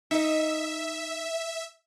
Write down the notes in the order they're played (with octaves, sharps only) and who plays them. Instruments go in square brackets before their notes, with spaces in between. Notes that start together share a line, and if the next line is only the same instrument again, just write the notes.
[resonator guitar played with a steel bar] D#4 D#5 [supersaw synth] E5